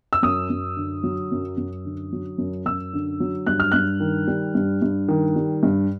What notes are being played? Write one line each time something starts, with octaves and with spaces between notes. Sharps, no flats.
E6
F#2 D#6
F#2
D3
F#3
F#2
F#2
D3
F#3
F#2
F#2 E6
D3
F#3
G2 F#6
F6
G2 F#6
D#3
G3
G2
G2
D#3
G3
G2